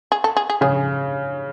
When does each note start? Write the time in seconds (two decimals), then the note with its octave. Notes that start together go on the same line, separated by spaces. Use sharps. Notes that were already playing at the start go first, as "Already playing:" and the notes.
0.12 G#4
0.24 A4
0.37 G#4
0.50 G#4
0.61 C#3 G#4